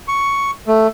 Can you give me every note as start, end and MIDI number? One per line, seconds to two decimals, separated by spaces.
0.08 0.51 85
0.67 0.87 57